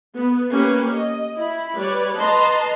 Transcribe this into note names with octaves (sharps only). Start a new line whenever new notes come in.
B3
A#3 C#4 G4 B4
D#5
E4 B5
G3 B4 C#5 D5
B4 D#5 A5 A#5 C6